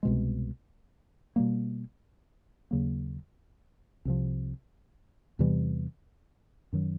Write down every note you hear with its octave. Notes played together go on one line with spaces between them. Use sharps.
C2 B2 G#3
B2 G3 A#3
D#2 C#3 F#3 A#3
C2 C3 F3
E2 C3 E3 G3
F#2 D#3 F#3